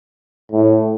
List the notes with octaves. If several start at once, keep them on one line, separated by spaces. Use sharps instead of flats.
A2